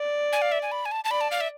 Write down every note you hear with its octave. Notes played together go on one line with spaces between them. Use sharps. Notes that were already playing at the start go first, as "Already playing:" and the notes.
Already playing: D5
G#5
F5
E5
G#5
B5
G#5
A5
A5
D5 B5
A5
F5
E5